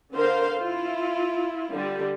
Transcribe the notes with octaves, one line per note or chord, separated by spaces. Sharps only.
D3 A#4 C5 F5
E4 F4
D3 G3